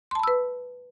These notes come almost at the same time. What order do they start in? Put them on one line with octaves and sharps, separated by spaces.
C6 A5 B5 E6 B4